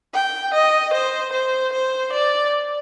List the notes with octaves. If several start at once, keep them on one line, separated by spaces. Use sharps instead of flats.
G5
D#5
C5
C5
C5
D5